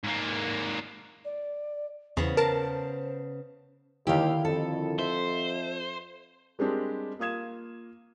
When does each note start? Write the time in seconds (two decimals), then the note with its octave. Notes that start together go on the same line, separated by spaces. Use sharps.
0.03 G#2 A#3
1.25 D5
2.17 E2 C#3 B3 C5
2.37 A#4 A5
4.07 D#2 D3 D#3 E4 G4 F5
4.45 F2 A4
4.99 C5 E5
6.59 G3 G#3 C4 D4 G4 A#4
7.19 A#3 F4 D#6 G#6 E7